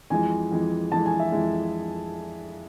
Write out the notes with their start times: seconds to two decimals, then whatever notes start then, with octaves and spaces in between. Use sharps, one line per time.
0.10 F2 E3 G#3 G#5
0.52 F2 E3 G#3
0.92 F2 E3 G#3 A5
1.06 G#5
1.20 E5
1.32 F2 E3 G#3